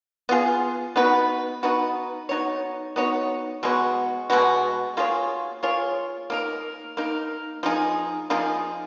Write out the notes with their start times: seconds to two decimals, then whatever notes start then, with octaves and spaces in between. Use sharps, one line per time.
0.29 B3 F4 G#4
0.96 B3 D#4 F#4 B4
1.63 B3 D#4 F#4 B4
2.29 B3 D#4 F#4 C#5
2.96 B3 D#4 F#4 C#5
3.63 B2 G#3 B3 F#4
4.30 B2 G#3 B3 F#4
4.97 A#3 F4 G#4 C#5
5.63 A#3 F4 G#4 C#5
6.30 A#3 D#4 A#4
6.97 A#3 D#4 A#4
7.63 F3 A#3 D#4 G#4
8.30 F3 A#3 D#4 G#4